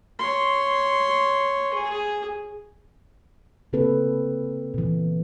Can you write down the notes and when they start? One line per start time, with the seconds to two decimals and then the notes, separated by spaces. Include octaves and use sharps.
0.19 C#5 C6
1.73 G#4
3.73 C#3 A#3 C4 A4 B4
4.74 A#2 E3